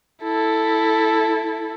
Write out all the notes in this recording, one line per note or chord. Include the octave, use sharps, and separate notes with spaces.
E4 A4